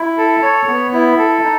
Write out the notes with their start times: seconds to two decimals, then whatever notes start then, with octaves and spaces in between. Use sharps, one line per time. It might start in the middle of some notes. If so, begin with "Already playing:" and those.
Already playing: E4
0.17 A4
0.42 C#5
0.68 B3
0.93 E4
1.18 A4
1.43 D#4